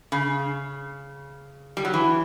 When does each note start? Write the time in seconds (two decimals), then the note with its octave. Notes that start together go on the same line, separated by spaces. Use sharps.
0.12 C#3
1.77 G3
1.85 F#3
1.94 E3